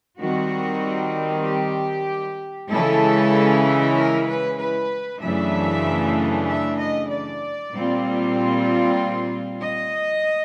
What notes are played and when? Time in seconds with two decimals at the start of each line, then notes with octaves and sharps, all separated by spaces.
0.18 D#3 G3 C4 F#4
1.44 G4
2.69 C#3 E3 G#3 C#4 E4 A4
3.95 A#4
4.27 B4
4.58 B4
5.21 F#2 C#3 E3 A3 D4 E5
6.46 E5
6.78 D#5
7.09 D5
7.72 A#2 G3 C4 F4
9.61 D#5